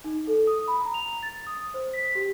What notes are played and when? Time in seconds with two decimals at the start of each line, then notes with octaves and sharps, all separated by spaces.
0.04 D#4
0.27 A4
0.47 D#6
0.68 B5
0.81 A#5
0.94 F7
1.23 A6
1.47 D#6
1.74 C5
1.93 B6
2.15 G4